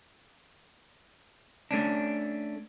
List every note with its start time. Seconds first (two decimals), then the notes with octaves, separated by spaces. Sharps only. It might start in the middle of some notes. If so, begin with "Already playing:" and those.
1.71 A3 C#4 D4